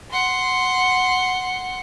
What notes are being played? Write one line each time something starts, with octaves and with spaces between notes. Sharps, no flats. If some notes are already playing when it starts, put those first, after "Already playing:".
F#5 C6